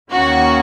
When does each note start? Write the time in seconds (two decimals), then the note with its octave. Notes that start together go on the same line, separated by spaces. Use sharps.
0.11 D#2 D#3 A#3 C#4 F#4